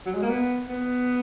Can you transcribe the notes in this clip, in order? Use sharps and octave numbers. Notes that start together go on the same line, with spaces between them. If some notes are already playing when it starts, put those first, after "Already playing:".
F#3
G#3
A#3
B3
B3